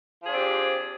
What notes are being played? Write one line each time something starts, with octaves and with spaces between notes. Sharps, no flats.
F3 C4 D4 G4 G#4